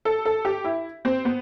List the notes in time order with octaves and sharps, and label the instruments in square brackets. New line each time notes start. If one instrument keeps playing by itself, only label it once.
[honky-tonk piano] A4
A4
G4
E4
C4
B3